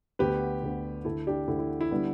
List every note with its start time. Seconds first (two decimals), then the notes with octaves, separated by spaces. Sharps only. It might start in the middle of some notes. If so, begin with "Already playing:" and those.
0.19 D2 D3 B3 G4 B4
0.62 D2 D3 B3
1.05 D2 D3 A3 E4 A4
1.27 D4 G4
1.48 D2 D3 A3 E4
1.59 E4
1.81 E4
1.91 D3 G3 B3